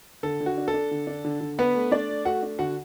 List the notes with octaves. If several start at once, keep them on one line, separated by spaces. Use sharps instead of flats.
D3 A4
D3
F#4
D4
A4
D4
D3
D4
D3
D3
B3 D4 B4
A3
A3 D4 D5
A3
A3 F#4 F#5
D4
D3 F#4 F#5